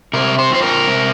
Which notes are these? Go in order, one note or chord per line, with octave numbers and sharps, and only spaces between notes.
C3 A#4
C5
F3 C4 C5
A#4
C3